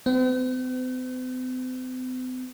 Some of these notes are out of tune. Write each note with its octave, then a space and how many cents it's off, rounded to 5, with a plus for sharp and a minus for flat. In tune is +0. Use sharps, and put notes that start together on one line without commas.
C4 -45